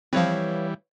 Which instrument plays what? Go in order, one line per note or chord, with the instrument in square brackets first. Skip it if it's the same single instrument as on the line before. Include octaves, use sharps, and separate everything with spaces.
[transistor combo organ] E3 G3 [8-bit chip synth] F3 C4 [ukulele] B4 C#5 F5